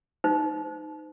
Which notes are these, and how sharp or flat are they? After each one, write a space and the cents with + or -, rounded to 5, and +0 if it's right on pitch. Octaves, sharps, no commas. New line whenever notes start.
D#4 +0 C5 -40